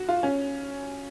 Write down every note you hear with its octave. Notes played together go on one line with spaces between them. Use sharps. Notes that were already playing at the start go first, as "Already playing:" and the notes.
Already playing: F#4
F4
C#4